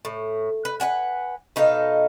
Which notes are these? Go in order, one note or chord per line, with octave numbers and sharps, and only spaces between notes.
A2
B4
B4 D5 F#5 G#5
B2 D#4 A4 F5